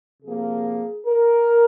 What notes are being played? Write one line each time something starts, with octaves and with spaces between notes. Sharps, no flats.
C3 F3 A#3 G#4
A#4